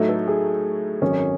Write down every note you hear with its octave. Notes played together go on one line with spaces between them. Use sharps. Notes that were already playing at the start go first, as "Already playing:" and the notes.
Already playing: A2 F#3 A3 D#4
A4
G#4
G#1 F#2 D#3 F#3 A3 C#4